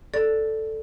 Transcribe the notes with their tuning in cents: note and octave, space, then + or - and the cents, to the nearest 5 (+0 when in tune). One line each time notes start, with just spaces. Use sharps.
A4 +0 D5 +0